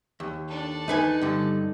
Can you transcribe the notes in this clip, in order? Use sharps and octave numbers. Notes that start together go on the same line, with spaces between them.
D#2
D4 A4
D#4 B4 G#5
G2 D3